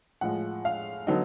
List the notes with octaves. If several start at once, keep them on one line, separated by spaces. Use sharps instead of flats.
A2 F3 G#3 F#5
F5
D3 F#3 B3 D#4